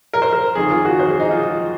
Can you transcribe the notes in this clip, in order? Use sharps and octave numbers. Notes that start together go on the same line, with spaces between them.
A#4
C5
A#4
F2 D#3 G#4
F4
F#4
C5
G#4
D#4
F4
F4